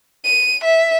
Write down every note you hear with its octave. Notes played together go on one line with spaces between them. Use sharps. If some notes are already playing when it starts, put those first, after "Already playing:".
D#7
E5